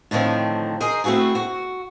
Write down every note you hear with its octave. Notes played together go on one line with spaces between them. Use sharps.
A2 D3 D#3 F3 C4
G#4 A#4 C5 D#5
A3 C4 E4 F#4 G#4
F#4